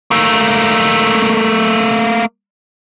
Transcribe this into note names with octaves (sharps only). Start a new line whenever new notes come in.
A3 A#3